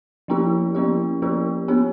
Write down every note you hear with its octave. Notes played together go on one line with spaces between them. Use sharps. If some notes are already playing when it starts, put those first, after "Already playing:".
F3 A#3 C#4 E4 G4
F3 A#3 C#4 E4 G4
F3 A#3 C#4 E4 G4
B3 D4 G4